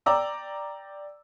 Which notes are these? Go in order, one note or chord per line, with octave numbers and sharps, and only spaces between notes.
D5 G5 A#5 D6 E6